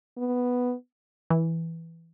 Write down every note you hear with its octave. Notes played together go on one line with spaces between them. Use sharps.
B3
E3